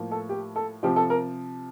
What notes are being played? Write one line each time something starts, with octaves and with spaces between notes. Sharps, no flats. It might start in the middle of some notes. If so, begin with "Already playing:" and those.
Already playing: A2 F3 A#3
A4
G4
A4
C3 F3 C4 G4
A4
A#4